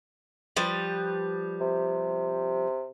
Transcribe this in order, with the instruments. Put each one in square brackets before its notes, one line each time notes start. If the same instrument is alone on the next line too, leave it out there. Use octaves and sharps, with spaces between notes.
[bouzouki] F3 G3 B4
[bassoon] C3